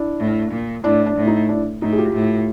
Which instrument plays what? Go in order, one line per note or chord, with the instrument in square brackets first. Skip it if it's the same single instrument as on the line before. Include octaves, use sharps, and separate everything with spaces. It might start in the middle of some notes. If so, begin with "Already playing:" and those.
Already playing: [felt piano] D4 E4
[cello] A2
A#2
[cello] A2 [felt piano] D4 E4
[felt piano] D4
[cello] A2
[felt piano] D#4
D4 E4
[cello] A2 [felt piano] D#4
[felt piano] G#4
F4 G4
[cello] A2